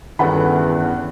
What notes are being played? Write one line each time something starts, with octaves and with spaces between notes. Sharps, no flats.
E2 G2 D#3 B3 C#4 A4 F#5 B5